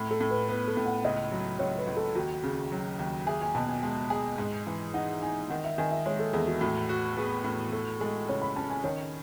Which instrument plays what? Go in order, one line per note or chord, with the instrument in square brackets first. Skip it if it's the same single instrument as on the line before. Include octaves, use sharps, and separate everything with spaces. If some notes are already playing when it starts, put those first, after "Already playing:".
Already playing: [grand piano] A2
[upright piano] A4
[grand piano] A2
[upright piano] B4
[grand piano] B3 [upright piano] B4
[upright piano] A4
[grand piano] A2
[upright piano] F#5
[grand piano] C#2 [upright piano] D#5
[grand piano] F#3
[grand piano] C#2 [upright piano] C#5
[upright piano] B4
[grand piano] C#2
[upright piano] A4
[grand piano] D#2 [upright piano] F#4
[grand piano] C#3
F#3
D#2
[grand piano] G#4 [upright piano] E5
[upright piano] G#5
[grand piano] B2 [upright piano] A5
[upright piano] G#5
[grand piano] G#3
G#4
G#2
E3
[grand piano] D#4 [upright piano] F#5
[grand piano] D#4 [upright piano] G#5
[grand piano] D#3 [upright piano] F#5
[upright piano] E5
[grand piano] D#3 [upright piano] G#5
[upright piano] E5
[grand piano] G#3 [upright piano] C#5
[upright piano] A4
[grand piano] E2 [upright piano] G#4
[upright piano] F#4
[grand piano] A2 [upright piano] F#4
[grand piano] F#4
[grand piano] B3 [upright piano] G#4
[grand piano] A2
[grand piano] F#4 [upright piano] A4
[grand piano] G#3 [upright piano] A4
[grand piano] C#3 [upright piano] C#5
[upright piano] B5
[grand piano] C#4 [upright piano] A5
[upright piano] G#5
[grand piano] D#3 [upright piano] C#5